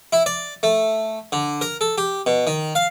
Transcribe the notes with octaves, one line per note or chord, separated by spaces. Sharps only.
E4
D5
A3
D3
A#4
A4
G4
B2
D#3
F5